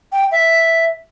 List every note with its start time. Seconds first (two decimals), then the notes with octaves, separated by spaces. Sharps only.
0.13 G5
0.32 E5